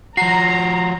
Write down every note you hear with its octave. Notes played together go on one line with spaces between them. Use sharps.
F3 F#4 A#5 C7